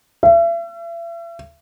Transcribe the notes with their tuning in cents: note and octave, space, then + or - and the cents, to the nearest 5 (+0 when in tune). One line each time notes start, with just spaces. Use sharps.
E5 +40